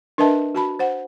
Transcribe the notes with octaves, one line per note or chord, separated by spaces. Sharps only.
D4 A#4 B4 D#5 E5 A5
F#4 A5 B5
C5 F#5